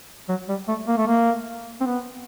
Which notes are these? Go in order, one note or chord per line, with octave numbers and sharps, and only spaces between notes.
F#3
G3
A3
A#3
A3
A#3
C4
B3